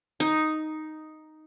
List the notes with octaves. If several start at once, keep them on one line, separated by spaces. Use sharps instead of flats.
D#4